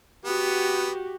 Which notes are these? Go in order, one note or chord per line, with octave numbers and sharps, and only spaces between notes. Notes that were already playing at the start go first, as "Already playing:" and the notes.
B3 F#4 G4